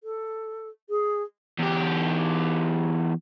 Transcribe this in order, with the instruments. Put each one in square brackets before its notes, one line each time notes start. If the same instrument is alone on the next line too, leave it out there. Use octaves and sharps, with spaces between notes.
[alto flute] A4
G#4
[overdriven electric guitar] E2 G4